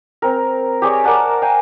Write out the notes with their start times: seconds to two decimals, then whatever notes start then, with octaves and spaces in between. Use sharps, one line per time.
0.22 C4 A#4
0.82 G4 G#4 C#5 D5
1.04 A#4 D5 F#5 A5
1.42 F5 G5 G#5